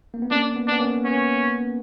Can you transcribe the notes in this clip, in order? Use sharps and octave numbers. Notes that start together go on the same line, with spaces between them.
A#3
B3
A#3 C#4 D4
B3
B3 D4
A#3 C#4
B3 C#4